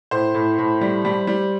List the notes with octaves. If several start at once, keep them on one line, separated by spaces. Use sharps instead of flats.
A2 C5
A2
A2
G3
G3
G3